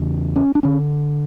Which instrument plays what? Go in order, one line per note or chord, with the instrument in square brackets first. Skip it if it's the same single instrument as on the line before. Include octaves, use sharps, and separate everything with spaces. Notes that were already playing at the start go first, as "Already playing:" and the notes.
Already playing: [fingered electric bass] E2 C#3
C#4
D4
D3 C#4